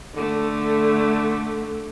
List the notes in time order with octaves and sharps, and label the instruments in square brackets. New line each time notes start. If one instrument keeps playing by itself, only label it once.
[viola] D3 A3